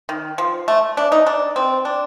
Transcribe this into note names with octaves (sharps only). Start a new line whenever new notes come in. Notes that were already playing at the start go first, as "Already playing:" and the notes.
D#3
F3
A3
D4
D#4
D4
C4
D4